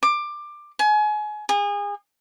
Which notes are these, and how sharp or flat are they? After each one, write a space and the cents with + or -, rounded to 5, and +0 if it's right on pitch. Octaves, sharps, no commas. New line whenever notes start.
D6 +15
G#5 +30
G#4 -30